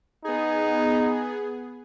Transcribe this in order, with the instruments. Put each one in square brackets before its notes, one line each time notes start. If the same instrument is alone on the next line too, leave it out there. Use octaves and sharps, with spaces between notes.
[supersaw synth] B3 G#4 [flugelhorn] D#4